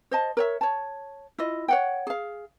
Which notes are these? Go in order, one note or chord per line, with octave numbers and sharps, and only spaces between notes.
C5 D#5 A5
A#4 C#5 E5
C#5 A5
E4 F4 D#5
C#5 F#5 G5
G#4 F5